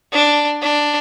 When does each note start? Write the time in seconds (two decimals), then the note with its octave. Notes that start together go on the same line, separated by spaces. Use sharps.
0.12 D4
0.62 D4